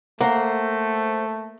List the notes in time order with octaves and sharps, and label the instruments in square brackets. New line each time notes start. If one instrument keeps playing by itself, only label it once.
[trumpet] A3 [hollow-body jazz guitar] A#3 [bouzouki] C5 F#5